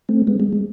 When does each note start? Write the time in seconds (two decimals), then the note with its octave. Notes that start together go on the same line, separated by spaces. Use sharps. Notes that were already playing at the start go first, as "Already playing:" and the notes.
0.09 A3 C4
0.27 G#3 B3
0.40 G#3
0.53 G#3